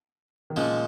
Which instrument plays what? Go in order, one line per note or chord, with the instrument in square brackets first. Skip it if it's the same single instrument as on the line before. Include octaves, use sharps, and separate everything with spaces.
[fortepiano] D#3
[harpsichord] A#2 F3 G#3 [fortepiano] C#3